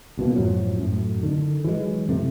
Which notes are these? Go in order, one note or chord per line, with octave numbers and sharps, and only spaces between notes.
C#2 B2 E3 A#3
F#2 A2 F3 F#3
F#2 A2
D3 D#3
E3 F#3 G#3
F#2 C3 A3